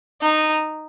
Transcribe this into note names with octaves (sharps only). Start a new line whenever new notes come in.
D#4